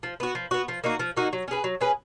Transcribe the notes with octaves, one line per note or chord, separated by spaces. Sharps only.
F3
B3 F#4
F3
B3 F#4
F3
A#3 D#4 F#4
F3
A#3 D#4 F#4
F#3
C#4 G#4 B4
F#3
C#4 G#4 B4